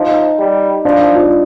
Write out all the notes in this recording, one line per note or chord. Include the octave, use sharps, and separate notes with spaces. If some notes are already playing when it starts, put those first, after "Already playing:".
Already playing: F3 D#4
G3
F3 D4
D#4
F4